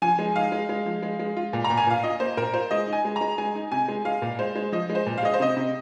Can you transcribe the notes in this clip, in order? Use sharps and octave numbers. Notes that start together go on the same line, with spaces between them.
F3 G#5
G#3
D#4 F5
G#3
G#3
F3
G#3
G#3
F4
A#2
A#5
A#2
G#5
A#2 F5
F4 D#5
A#3 C5
A#2 A#4
F4 C5
G#3 D#5
D#4
G#5
G#3
A#5
G#3
G#3 G#5
D#4
C3 G#5
G#3
G#3 F5
A#2
G#3 C5
G#3
F3 D#5
G#3
C5
A#2
F5
G#3 D#5
C5
C3 D#5
C3